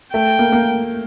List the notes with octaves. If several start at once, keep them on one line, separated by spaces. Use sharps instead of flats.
A3 G5
A#3
A#3